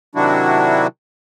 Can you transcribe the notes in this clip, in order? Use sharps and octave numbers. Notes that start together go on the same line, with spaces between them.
C3 D#3 F#3 D4 E4 F#4